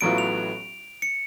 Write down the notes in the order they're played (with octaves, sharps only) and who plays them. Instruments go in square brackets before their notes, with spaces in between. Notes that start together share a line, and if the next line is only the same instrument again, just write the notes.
[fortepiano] A1 A2 F#3 B3 F4 [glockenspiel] D7
[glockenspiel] F7
C#7